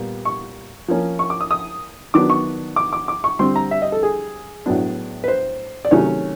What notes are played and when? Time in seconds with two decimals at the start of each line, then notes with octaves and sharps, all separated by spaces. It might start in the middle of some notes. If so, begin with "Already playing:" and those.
Already playing: A#2 G3 B3
0.25 C#6
0.88 F3 A#3 C#4
1.19 C#6
1.30 D6
1.41 D#6
1.51 D#6
2.14 D#3 F#3 B3 D4 D6
2.30 C#6
2.76 D6
2.93 D6
3.08 D6
3.24 C#6
3.39 D3 G3 C4 C6
3.56 A#5
3.71 E5
3.82 D#5
3.92 A4
4.03 G#4
4.66 A2 F#3 B3 D4
5.24 B4
5.28 C5
5.85 D5
5.91 C3 D#3 F#3 A3 C#4 C#5